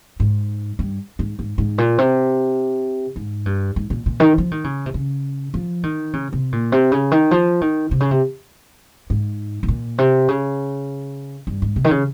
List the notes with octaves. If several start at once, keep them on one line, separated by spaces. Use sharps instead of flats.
G#2
G2
G#2
G#2
G#2
A#2
C3
G#2
G2
G#2
A#2
A#2
D#3
F3
D#3
C#3
C3
C#3
F3
D#3
C#3
C3
A#2
C3
C#3
D#3
F3
D#3
C3
C#3
C3
G#2
G#2
A#2
C3
C#3
G2
G#2
C3
D#3
C#3